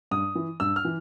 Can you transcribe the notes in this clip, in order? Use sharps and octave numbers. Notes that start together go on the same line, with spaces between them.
G2 D#6
E3
G2 E6
F6
E3